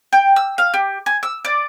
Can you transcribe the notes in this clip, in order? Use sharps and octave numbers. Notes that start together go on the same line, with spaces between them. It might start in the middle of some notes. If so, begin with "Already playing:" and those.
G5
E6
F5
G4
G#5
E6
D5